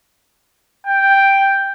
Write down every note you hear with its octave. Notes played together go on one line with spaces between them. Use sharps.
G5